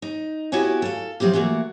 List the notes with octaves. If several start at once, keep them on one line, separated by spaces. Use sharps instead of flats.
D#4
B3 E4 F#4 G4 C#5 G#5
A4 F5
F3 F#3 C4 E4 G4
E3 A3 A#3 F#4